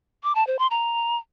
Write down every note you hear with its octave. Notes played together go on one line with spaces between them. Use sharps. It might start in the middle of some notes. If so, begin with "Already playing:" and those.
D6
A5
C5
C6
A#5